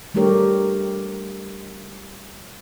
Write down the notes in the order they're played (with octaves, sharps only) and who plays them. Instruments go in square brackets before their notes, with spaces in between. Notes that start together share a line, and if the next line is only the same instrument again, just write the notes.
[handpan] G3 A3 D4 G4 A#4 C#5